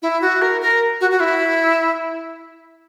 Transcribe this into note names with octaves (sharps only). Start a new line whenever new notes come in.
E4
F#4
A#4
A#4
F#4
F#4
E4